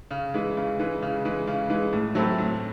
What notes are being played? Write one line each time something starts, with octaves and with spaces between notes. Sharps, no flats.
C#3
E3 G#3
C#3
E3 G#3
C#3
E3 G#3
C#3
E3 G#3
A2
F#3 A3 C4 E4
A2